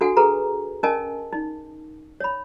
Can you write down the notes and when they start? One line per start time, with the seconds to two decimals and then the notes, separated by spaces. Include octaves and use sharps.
0.01 D4 F#4 A4 F#5 G#5
0.17 G#4 A4 B4 A#5
0.83 C#4 A#4 D#5 G#5 A5
1.33 D#4
2.20 C#5 B5